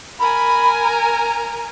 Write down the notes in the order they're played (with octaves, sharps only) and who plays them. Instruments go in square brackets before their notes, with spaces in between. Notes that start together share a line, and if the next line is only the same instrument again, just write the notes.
[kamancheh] A#4 G#5 [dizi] B5
[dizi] A#5